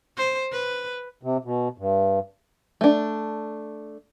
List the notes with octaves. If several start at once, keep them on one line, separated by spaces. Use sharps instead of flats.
C5
B4
C3
B2
G2
A3 D4